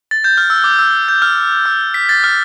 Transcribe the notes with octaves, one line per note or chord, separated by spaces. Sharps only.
A6
G6
F6
E6
D6
E6
G6
F6
E6
B6
A6
F6